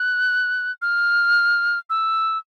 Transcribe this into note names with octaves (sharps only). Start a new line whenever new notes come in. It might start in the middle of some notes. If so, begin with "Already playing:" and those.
Already playing: F#6
F6
E6